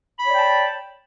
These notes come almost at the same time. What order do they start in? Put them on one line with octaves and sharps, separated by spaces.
B5 C#5 D5 G5 A5